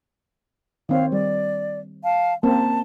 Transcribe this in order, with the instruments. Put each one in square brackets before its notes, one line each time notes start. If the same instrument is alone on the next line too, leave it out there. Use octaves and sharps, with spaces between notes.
[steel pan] D#3 C4 C#5 [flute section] F5
[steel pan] G3 [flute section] D5
[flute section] F5 A5
[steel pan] A#3 C4 C#4 [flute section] A5